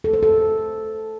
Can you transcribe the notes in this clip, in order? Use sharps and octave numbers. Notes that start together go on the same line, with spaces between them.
A4
C5
A4